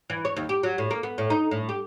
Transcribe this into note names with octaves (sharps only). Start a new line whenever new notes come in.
E3
C#5
D#2
G4
F#3
A2
A#3
B3
A2
D#4
A2
G4